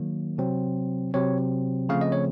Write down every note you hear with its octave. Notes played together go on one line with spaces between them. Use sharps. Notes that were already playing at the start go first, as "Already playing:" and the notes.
Already playing: D#3 F#3 A#3
C3 F#3 C4
C3 F#3 C4 C#5
C#3 F3 A3 C4 F5
D#5
C#5